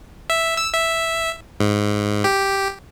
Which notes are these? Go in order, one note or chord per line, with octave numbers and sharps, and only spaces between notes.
E5
E6
E5
G#2
G4